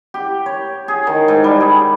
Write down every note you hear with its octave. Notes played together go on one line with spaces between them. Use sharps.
G4
C#5
G#4
D#3
G#2
G3
G#4